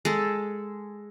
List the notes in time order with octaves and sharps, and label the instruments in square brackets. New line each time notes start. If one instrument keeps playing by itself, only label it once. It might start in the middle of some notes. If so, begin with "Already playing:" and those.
[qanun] G#3 A4